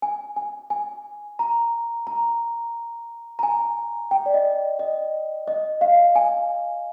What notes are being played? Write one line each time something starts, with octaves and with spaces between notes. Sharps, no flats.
G#5
G#5
G#5
A#5
A#5
A#5
G#5
G5
D5
D#5
D#5
D#5
F5
G#5